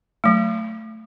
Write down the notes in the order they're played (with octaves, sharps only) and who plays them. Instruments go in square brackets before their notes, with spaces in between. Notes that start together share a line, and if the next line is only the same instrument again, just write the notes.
[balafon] F#3 A3